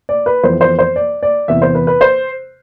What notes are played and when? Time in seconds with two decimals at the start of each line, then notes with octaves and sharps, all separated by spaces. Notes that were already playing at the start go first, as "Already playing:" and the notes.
0.09 D5
0.26 B4
0.43 F2 E3 B3 C5
0.61 C5
0.79 C5
0.96 D5
1.23 D5
1.48 E2 C3 E3 B3 E5
1.62 C5
1.75 B4
1.87 B4
2.01 C5